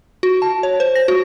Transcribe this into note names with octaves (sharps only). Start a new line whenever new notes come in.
F#4
A5
C#5
C5
A#6
F#4